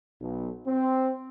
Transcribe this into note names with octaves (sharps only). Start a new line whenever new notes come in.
B1
C4